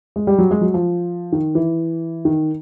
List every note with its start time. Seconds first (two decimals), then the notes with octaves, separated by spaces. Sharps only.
0.16 G#3
0.27 G3
0.38 F#3
0.51 G#3
0.61 F#3
0.74 F3
1.32 D#3
1.55 E3
2.25 D#3